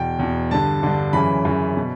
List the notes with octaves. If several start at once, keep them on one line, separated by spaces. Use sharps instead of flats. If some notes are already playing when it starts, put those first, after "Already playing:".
Already playing: E2 B2 G5
E2 B2
G2 D3 A5
G2 D3
F#2 C#3 E3 B5
F#2 C#3 E3
B2